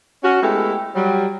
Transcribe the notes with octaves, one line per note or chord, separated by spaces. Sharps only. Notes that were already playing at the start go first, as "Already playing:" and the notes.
C#4 F#4
G#3 A3 B3 E4 G4 A4
F#3 G3